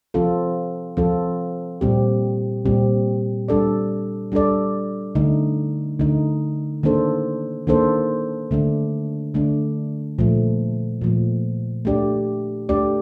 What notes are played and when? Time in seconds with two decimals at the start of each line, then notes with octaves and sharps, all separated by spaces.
0.14 F3 C4 F4 A4
0.97 F3 C4 F4 A4
1.81 A#2 G3 C4 G4
2.65 A#2 G3 C4 G4
3.48 G3 D4 A4 D5
4.32 G3 D4 A4 D5
5.15 D3 A3 D#4
5.99 D3 A3 D#4
6.83 D#3 A#3 D4 A4 C5
7.67 D#3 A#3 D4 A4 C5
8.51 D3 A3 D4
9.34 D3 A3 D4
10.18 A#2 F3 A3
11.01 A#2 F3 A3
11.85 A3 D4 G4 D5
12.69 A3 D4 G4 D5